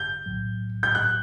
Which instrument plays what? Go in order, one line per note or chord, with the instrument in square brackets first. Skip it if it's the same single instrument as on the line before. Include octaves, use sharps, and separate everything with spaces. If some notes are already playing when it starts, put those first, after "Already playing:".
Already playing: [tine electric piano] G1 F#2 D3 [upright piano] G6
[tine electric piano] B1 A2 F#3
[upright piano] G6
F#6